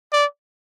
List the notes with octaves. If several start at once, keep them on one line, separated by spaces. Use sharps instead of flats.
D5